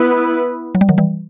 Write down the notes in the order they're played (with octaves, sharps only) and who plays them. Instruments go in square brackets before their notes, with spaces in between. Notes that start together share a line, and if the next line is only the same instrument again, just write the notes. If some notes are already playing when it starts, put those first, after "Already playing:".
Already playing: [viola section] B3 E4 B4
[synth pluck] F#3
G3
D#3 F#3
E3 G3